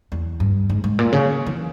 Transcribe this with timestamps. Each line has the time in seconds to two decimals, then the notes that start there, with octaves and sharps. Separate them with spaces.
0.12 E2
0.40 G2
0.70 G#2
0.84 G#2
0.99 A#2
1.12 C#3
1.47 E3